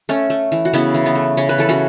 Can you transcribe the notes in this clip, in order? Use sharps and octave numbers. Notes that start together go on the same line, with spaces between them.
A3 C#4
A3
E3
F#4
C#3 B3 E4
E3
B3
A3
C#3 C#4
B4
E3 A4
C#4 F#4